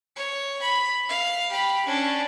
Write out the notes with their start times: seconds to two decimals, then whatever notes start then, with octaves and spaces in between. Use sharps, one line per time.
0.16 C#5
0.61 B5
1.09 F5
1.50 G4 B5
1.86 C#4 D4